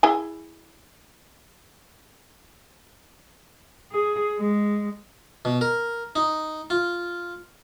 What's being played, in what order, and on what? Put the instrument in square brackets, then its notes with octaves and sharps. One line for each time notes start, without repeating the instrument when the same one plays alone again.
[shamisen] E4 G#4 G#5
[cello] G#4
G#3
[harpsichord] B2
A#4
D#4
F4